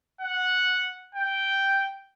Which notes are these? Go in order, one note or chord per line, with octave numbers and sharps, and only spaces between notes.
F#5
G5